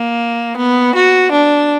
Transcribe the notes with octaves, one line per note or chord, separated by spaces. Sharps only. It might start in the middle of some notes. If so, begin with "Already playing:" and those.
Already playing: A#3
B3
F#4
D4